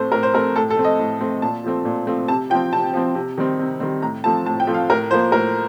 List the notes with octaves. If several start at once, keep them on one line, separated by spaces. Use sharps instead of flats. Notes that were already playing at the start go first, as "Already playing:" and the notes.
Already playing: A2 A3 C4 C5
A2 A#4
C5
A3 C4 A#4
A2 A4
A4
A3 C4
D#5
A2
A3 C4
A#2 A5
F3 A3 C4
A#2
F3 A3 C4
C3 A5
F3 C4 G5
C3 A5
F3 C4
C3
D#3 G3 C4
C3
D#3 G3 C4
A2 A#5
F3 A3 C4 A5
A2 A5
G5
F3 A3 C4
F5
A2 A#4
F3 A#3 C5
A2 A#4